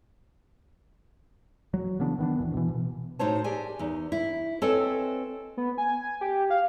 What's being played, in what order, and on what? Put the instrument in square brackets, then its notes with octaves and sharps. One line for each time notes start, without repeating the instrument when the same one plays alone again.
[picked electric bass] F#3
C#3 E3 B3 D4
D#3 B3 D4
D1 G#2 E3
B2 E3
B2
[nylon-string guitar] A2 D#4 F#4 C5 C#5 A5
G4 G#4 A#4 D5 G#5
E2 D#4
E4
C4 A4 B4 C#5 D#5 G#5
[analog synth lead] B3
G#5
G4
F5